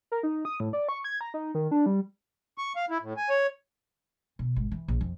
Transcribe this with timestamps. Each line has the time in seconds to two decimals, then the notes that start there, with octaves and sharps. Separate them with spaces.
0.12 A#4
0.23 D#4
0.45 D#6
0.60 A2
0.73 D5
0.89 C#6
1.04 G#6
1.21 A#5
1.34 D#4
1.55 D#3
1.71 D4
1.86 G3
2.58 C#6
2.76 F5
2.90 E4
3.02 A2
3.17 G#5
3.30 C#5
4.39 B2
4.56 G#1
4.71 E3
4.88 A#1
5.01 F2